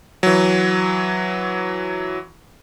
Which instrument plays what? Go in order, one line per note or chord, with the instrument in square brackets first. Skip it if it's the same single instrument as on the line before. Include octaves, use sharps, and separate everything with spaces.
[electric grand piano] E3 F#3